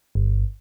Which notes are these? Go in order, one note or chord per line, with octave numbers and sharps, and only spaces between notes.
G1